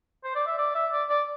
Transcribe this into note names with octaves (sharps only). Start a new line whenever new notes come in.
C5
D5
E5
D5
E5
D5
D5